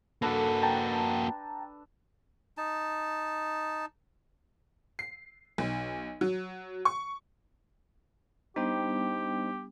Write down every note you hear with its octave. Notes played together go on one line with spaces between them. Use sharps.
A#3 D4 F#4 A4 B4
G5 A5 A#5
D#4 A5
C7
B1
F#3
C#6
G3 B3 D4 D#4 G4 C5 G5